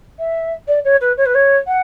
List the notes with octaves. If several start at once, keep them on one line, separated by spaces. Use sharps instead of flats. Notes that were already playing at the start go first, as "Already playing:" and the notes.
E5
D5
C#5
B4
C#5
B4
C#5
F#5